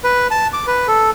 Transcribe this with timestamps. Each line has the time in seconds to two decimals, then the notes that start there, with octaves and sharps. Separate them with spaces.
0.04 B4
0.31 A5
0.53 D6
0.67 B4
0.88 A4